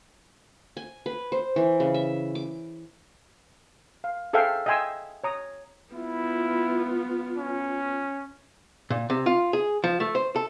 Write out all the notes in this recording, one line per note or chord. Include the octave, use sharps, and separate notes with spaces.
G#5
B4
C5
E3
C#3
E5
D6
F5
G#4 A4 C5 E5 F5 G5
D#5 E5 G5 G#5 C6 E6
C#5 A#5 D#6
B3 E4 F4
C#4
A#2
C3
F4
G#4
F3
A3
C5
A4